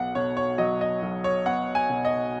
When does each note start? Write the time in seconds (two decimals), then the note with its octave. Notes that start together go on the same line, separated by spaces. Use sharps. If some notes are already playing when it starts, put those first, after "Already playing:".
Already playing: B1 B3 F#5
0.15 B2 C#5
0.37 C#5
0.58 F#3 D#5
0.81 D#5
1.02 B1
1.24 C#5
1.46 B3 F#5
1.75 G#5
1.90 B2
2.05 D#5